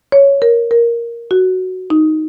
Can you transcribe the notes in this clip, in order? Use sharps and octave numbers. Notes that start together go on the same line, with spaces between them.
C#5
A#4
A#4
F#4
D#4